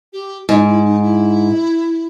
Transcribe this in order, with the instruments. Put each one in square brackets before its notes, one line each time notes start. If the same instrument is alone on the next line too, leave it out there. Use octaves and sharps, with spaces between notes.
[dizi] G4
[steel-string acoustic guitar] G#2 [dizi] D#4
[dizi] E4
D#4
E4